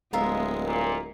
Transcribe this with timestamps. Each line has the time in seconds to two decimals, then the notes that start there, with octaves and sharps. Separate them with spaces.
0.13 D1 G#3 B3 F4 A#4 E5
0.64 A#2